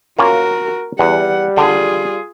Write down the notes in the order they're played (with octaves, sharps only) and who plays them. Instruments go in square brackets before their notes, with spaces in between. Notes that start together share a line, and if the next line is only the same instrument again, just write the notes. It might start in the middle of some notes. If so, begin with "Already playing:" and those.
[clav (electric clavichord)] A#3 C#4 F4 [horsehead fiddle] F#4 A#4
[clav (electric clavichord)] E2 [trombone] G3 [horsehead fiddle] F#5
[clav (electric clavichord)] D3 [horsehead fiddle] F4 G#4